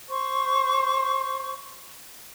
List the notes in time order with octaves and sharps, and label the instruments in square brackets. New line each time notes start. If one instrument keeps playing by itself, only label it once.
[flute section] C5 C#6